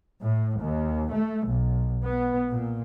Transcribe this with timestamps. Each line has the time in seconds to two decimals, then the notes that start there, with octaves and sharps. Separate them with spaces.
0.23 A2
0.59 D#2
1.13 A3
1.47 B1
2.05 B3
2.51 A#2